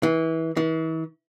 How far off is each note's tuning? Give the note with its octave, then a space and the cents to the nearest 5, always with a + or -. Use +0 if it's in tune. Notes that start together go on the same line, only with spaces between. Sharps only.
E3 -25
E3 -40